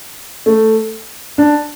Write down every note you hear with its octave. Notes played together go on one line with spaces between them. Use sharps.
A3
D4